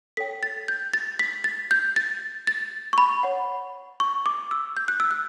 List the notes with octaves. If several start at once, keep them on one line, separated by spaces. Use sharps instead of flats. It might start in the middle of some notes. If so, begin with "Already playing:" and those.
A4 C#5 G5 B6
A6
G6
A6
B6
A6
G6
A6
A6
C#6
B5
C#5 F#5
C#6
D6
E6
G6
F#6
E6
F#6